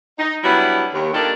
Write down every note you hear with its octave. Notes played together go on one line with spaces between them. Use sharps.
D#4
F#3 G3 B3 D4 E4
D#2
D#3 G3 A#3 D4 F4 A4